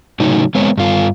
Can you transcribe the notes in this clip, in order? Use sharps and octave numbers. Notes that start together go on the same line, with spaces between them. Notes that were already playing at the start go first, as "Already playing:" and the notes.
A2 C#3 F#3 D#4
G#3 B3 C4 C#5
G2 F4